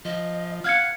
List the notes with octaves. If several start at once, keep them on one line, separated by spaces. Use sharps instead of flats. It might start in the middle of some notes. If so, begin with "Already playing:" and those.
F3 D#5
F5 F#5 F6 G#6 C#7